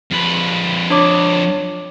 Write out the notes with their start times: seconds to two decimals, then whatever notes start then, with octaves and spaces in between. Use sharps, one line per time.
0.11 F2 B4
0.90 D4 C#5 D6